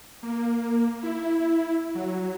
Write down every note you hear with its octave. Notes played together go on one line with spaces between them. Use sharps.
A#3
E4
F#3